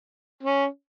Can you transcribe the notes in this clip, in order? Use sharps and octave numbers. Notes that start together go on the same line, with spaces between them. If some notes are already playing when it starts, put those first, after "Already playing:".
C#4